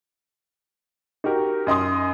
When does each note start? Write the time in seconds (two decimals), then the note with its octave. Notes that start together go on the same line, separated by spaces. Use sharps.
1.24 D#4 F#4 G4 A#4
1.67 F#2 D#5 C6 D#6